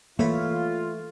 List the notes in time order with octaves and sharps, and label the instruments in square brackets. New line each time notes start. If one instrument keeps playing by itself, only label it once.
[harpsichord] E3 C#5 B5 [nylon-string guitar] A3 [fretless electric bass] A#3 [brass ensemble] F4